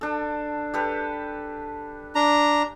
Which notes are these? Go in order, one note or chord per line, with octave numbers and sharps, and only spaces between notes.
D4 A4
G4 A4 B4
D4 A#5